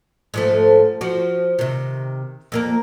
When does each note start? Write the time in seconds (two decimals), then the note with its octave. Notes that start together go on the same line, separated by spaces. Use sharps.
0.34 G#2 F3 A3
1.01 F3 F#4
1.59 C3 D#3
2.52 F2 A#3 A#4